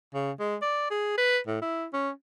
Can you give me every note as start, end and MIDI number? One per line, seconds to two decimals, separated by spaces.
0.14 0.31 49
0.39 0.56 56
0.62 0.87 74
0.91 1.14 68
1.18 1.38 71
1.47 1.59 45
1.62 1.86 64
1.93 2.10 61